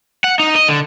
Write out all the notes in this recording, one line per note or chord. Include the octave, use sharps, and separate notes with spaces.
F#5
D#4
D#5
D3